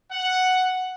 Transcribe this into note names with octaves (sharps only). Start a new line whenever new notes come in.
F#5